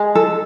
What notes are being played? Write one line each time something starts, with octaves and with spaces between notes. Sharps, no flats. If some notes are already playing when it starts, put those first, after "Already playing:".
Already playing: G#3
A4